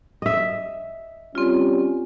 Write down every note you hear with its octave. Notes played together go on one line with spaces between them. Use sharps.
D#5 E5
G3 C4 C#4 F4